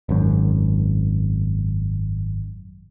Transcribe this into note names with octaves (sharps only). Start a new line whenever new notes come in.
G#1 F#2